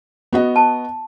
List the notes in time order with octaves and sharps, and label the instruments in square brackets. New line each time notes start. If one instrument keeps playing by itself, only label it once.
[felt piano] B3 F#4 D#5
[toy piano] A5